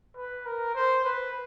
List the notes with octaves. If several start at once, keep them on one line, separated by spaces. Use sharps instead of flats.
B4
A#4
C5
B4